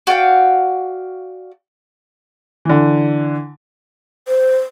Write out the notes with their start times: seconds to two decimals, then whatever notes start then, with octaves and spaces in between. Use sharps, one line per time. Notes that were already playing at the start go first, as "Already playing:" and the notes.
0.07 F#4 D5 F5 G5
2.65 D3 E3
4.28 C5